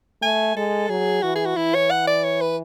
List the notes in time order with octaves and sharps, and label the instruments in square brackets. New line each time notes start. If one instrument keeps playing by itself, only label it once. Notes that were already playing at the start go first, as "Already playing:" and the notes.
[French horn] A3 [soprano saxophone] G#5
[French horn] G#3 [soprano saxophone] A4
[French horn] F#3 [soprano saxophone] G#4
[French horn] E3 [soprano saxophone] F#4
[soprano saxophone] G#4
F#4
[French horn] E3 [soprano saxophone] E4
[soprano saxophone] C#5
F#5
D5
C#5
B4